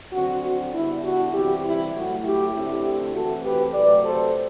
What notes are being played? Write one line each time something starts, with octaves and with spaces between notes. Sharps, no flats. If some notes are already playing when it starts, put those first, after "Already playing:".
D3 F#3 C4 F#4
F#4
D3 G3 B3 D4 E4
F#4
C3 E3 G3 C4 E4 G4
E4
A2 F#3 A3 F#4
E4 G4
D3 A3 C4 E4 G4
E3 A3 C4 F#4 A4
G4 B4
C3 F#3 A3 B4 D5
A4 C5